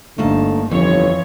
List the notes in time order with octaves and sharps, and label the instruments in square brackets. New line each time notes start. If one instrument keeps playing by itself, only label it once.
[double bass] G1 D#4 [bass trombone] D3 [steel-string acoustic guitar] A3 A#3 A5
[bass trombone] G1 [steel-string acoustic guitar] F2 [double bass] E3 F3 [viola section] C#5